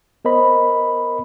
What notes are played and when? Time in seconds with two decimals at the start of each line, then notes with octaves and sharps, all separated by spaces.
0.25 B3 A#4 C5 D#5 B5